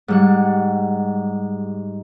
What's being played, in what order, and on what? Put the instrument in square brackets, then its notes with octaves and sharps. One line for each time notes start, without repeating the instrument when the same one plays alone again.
[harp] G#2 G3 F#5